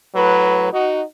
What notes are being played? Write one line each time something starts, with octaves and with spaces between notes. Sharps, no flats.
A2 F#3 B4
D#4 F#4